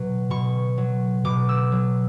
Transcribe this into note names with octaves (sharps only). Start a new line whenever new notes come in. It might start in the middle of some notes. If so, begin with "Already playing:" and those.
Already playing: B2 F#3
B2 C#6
F#3
B2 D6
E6
F#3